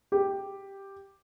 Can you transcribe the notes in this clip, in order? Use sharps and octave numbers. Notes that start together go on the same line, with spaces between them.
G4